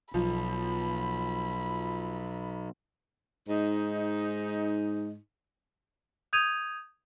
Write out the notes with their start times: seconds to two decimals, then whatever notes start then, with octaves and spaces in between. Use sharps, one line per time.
0.14 B1 F3 B5
3.47 G#2 D#4
6.33 D#6 G6 G#6 D#7 F7